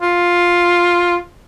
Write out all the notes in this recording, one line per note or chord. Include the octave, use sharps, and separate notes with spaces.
F4